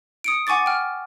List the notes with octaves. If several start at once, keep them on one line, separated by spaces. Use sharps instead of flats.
D#6 C#7 D7
F#5 G#5 C#6 D6 A6
G5 F6